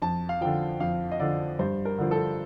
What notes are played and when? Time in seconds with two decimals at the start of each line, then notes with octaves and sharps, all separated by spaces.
0.02 F2 A5
0.29 F5
0.41 D3 F3 G5
0.80 F2 F5
1.11 D#5
1.20 D3 F3 D5
1.59 G2 C5
1.85 A#4
1.98 D3 F3
2.11 A4